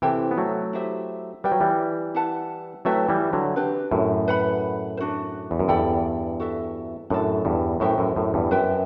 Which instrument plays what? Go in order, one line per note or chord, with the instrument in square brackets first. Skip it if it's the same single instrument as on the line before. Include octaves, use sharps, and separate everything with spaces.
[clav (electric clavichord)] C3 E3 [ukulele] E4 A4 C5 G5
[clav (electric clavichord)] B3
F#3 A3
[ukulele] E4 G4 C5 E5
[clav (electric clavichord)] G3 [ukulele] F#4 B4 E5 G5
[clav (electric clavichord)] F#3
E3 G3
[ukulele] E4 B4 F#5 A5
[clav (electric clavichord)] F#3 A3 [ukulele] E4 B4 E5 G5
[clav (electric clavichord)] E3 G3
D3 F#3
[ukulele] D4 G4 B4
[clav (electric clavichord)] F#2 A2
[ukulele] B4 F#5 B5
C5
D4 F#4
[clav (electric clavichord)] E2
F#2
[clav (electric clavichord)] E2 G2 [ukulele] A4 D5 G5 B5
[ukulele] F#4 A4 E5
[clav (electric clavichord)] F#2 A2 [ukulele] D4 F#4 A4
[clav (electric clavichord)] E2 G2
[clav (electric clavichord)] F#2 A2 [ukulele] F#4 C5 E5 G5
[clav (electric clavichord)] F#2 A2
F#2 A2
E2 G2
[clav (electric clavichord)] F#2 [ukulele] B4 E5 G5